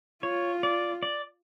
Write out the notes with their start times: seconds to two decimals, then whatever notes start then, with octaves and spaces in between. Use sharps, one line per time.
0.23 F4 C#5
0.63 D5
1.03 D5